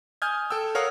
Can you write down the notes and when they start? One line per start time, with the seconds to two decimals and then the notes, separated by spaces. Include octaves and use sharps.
0.22 G#5 D#6 F6 G6 G#6
0.50 A4 G5 E6
0.75 A#4 C#5 F5 F#5 D#6